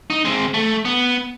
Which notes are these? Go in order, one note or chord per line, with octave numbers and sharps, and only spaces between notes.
D#4
G#3 C4
A3
B3